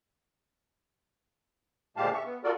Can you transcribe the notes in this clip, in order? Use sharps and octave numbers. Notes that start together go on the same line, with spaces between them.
D2 A#2 G#3 G4 F5 A5
E5 C#6
B3
F4 F#4 A4 A#4 D5